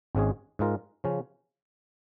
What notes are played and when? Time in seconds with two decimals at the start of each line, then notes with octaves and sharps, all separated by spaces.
0.15 G#1 G#2 G#3 C#4 G#4
0.59 G#2 G#3 F4 A#4
1.04 C#3 F3 C#4